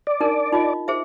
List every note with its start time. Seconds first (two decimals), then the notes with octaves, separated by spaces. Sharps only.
0.07 D5
0.21 D4 D#4 A#4
0.53 D#4 F4 D#5
0.88 G#4 C5 E5